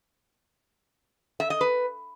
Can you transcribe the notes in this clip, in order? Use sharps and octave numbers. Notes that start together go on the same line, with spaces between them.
E5
D#5
B4